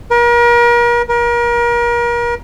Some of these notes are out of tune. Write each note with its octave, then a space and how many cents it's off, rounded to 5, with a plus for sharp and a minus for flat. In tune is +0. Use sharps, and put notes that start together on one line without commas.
A#4 +40
A#4 +35